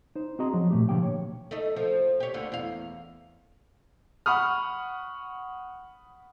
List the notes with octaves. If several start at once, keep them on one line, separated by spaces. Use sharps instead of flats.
D#4 C5
C4 F#4 G#4 D#5 A#5 C6
F3 F#3
A#2 A3 G4
B2 D3 F3 A#3 G4 G5
C#5
A3 D#4
F3
G4 C#5
D2 D3 F4
E2 F5
F#5 B5 C#6 D#6 F6